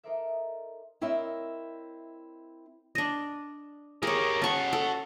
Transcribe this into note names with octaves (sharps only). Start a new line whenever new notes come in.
D#4 A4 A#4 C5 D5 E5
C4 E4 A#4 C#5 D#5 E5
D4 D#5
G4 G#4 A#4 C#5
C#4 F#4 A5 C#6
A4